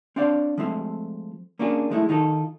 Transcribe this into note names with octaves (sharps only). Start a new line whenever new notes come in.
C4 D4 C#5 D5 F5
F3 G#3 A3 C4 F4
A#3 C#4 D4 F4 G#4
F3 G#3 A3 E4
D#3 D#4 F4 A4